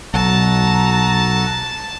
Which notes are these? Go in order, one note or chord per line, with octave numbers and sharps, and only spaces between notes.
B1 F#4 A4 A5 A#5